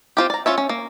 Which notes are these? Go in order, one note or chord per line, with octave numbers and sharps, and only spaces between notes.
C4 F4 G4
D5 A#5
C#4 F4 C#5 E5
C#4
A#3